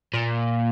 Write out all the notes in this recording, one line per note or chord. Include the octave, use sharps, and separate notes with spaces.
A#2